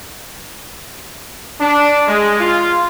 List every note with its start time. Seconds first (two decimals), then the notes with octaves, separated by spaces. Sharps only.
1.60 D4
2.08 G#3
2.40 F4